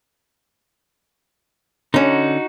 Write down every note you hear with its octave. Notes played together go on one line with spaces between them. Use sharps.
D3 C#4 D#4 F#4